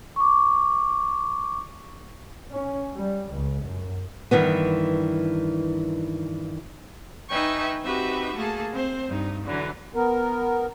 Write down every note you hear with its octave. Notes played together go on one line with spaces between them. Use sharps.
C#6 D6
C#4
G3
C#2
F#2
G2 D#3 E3 B3
D#4 B4 E5 G5 G#5 C#6
C4 D#4 F#4 G4 B4 E5
A3 A#3 G#4 A4
C4 C5
G2 D#4
D3 E3 F#3
B3 A#4